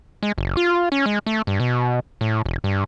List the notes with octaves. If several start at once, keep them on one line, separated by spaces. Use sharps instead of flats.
G#3
F#1
F4
C#4
G#3
A3
G2
B2
A2
E1
G2